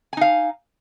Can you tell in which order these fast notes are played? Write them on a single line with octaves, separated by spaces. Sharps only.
G#5 D#4 F5